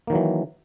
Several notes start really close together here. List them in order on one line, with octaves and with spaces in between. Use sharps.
A#3 D#3 F#3 E3